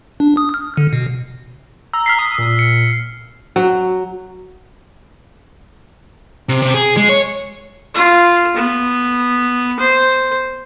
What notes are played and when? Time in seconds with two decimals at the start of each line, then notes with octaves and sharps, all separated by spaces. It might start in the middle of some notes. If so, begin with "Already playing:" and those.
0.20 D4
0.37 D#6
0.54 F6
0.77 D3
0.93 B2
1.93 A#5 E6
2.06 F6 B6 C7
2.19 D#6
2.38 A#2
2.59 C#7
3.56 F#3
6.49 C3
6.62 C3
6.74 G#4
6.97 G#3
7.09 C#5
7.94 F4
8.56 B3
9.79 C5